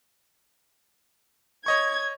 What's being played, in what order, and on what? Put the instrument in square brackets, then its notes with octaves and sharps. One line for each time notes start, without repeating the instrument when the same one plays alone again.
[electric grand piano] C#5 D#5 C#6 [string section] G#6